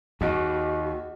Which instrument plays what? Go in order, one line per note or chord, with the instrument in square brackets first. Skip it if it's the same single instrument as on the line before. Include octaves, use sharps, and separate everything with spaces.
[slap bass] D#2 [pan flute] F#4 [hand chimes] G#4 D#5 F#5